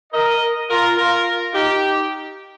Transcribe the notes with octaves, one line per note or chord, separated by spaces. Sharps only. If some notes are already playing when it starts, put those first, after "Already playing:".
A#4 D#5
F4 A#4
F4 A#4
D#4 G4